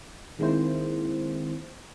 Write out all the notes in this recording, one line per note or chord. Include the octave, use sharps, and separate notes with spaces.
D#3 G#3 A#3 C4 E4 C5